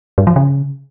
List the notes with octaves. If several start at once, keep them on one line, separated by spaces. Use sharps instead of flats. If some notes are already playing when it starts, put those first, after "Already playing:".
G2
F3
C#3